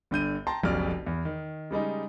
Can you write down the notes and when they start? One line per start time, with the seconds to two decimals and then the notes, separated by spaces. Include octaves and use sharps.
0.11 G1 D3 G6 D#7
0.47 G5 A5 A#5 C6
0.63 F1 B1 F2 C#3 D5 F6
1.06 E2
1.25 D#3
1.71 C#3 G3 G#3 D#4